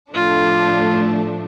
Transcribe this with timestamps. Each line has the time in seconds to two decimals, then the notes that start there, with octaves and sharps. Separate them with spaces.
0.13 A2 F3 A3 D4 F4